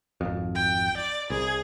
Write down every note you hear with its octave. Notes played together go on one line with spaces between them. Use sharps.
G#1 F2
G5
D5
C2 G#4